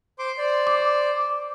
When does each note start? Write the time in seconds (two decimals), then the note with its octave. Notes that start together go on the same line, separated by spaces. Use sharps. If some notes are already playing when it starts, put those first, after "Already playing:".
0.19 C5 C6 D6
0.38 C5 D5
0.67 D6